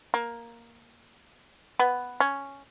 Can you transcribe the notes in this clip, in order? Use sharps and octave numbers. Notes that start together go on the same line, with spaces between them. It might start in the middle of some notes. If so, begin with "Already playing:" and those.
A#3
B3
C#4